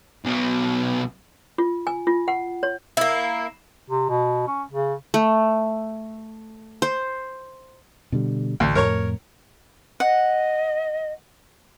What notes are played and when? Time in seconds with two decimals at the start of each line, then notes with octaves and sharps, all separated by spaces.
0.25 B1 B2
1.58 F4
1.87 G#5
2.07 F4
2.28 F#5
2.63 C#5
2.97 A#3 E4
3.90 C3
4.09 B2
4.48 C#4
4.71 C#3
5.14 A3
6.82 C5
8.12 B2 D3 G3
8.60 A1 D2
8.75 F2 A2 A#4 C#5 C#6
10.00 D#5 F#5